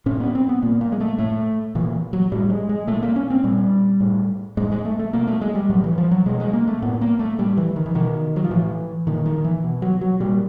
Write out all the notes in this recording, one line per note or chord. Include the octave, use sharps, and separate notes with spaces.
A2 C#4
B3
C4
B3
A#2 A#3
A#3
G#3
A3
A2 A3
A#2 E3
F#3
A2 G3
G#3
G#3
A#2 A3
A#3
C#4
C4
A#2 G3
A2
A2 G#3
G#3
A3
A3
B2 A#3
A3
G#3
G3
A2 F#3
E3
F3
F#3
B2 G#3
G#3
A#3
A3
A2 B3
A#3
A3
A2 G3
E3
D#3
E3
B2 D#3
F#3
F3
A2 E3
A#2 D#3
D#3
E3
B2
F#3
F#3
A#2 G3